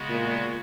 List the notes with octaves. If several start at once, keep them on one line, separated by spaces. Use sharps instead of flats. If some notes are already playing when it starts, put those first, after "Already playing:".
Already playing: C#3 G#3 B3 F#4
A#2